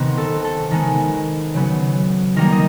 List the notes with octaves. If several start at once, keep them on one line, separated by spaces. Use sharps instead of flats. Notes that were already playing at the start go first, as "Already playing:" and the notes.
Already playing: C3 D#3 B3
A4
A4
D#3 G#3 B3
C#3 F#3 B3
D#3 G3 A#3 A#4
D#5